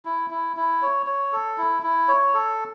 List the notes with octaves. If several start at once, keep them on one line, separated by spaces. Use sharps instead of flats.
E4
E4
E4
C#5
C#5
A4
E4
E4
C#5
A4